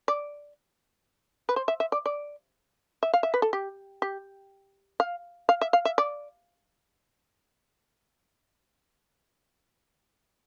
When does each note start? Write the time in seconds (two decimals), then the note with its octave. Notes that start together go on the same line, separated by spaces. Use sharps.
0.08 D5
1.49 B4
1.56 C5
1.68 E5
1.80 E5
1.92 D5
2.06 D5
3.03 E5
3.14 F5
3.23 E5
3.34 B4
3.42 A4
3.53 G4
4.02 G4
5.00 F5
5.49 F5
5.61 E5
5.73 F5
5.85 E5
5.98 D5